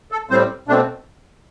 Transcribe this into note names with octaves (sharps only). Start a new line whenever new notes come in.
A4
A2 G3 C4 C5
B2 A3 C4 D4